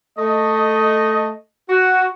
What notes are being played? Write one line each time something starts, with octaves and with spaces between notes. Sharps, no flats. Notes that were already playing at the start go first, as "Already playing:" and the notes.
A3 D#5
F#4